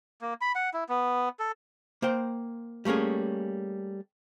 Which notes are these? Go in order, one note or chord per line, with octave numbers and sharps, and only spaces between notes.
A#3
B5
F#5
E4
B3
A4
A#3 C5 G5
G3 A3 A#3 C#4 G#4